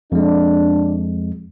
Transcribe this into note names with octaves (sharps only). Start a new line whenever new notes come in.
F2 G#3 D4